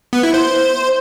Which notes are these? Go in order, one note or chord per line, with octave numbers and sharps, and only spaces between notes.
B3
E4
C5